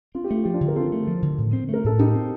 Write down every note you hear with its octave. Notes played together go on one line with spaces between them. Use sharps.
C4 F4
G4
A3 F4
F3 G4
D4 F4
D3
A#4
C4 F4 A4
A3
F3
D3
A2
C4
A3 A#4
A2 A4
A2 D#4 G4
C4